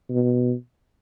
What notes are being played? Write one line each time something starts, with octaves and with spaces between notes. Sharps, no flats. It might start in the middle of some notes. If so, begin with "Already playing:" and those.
B2